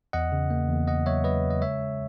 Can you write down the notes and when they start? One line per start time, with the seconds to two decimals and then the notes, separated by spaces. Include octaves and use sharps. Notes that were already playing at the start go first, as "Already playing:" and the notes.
0.13 E2 D#5 F#5
0.32 C#3
0.50 A#3
0.69 E2
0.88 E2 D#5 F#5
1.06 F#3 C#5 E5
1.24 F#3 B4 D#5
1.44 C#3
1.51 D#5
1.61 G#3 C#5 E5
1.80 G#3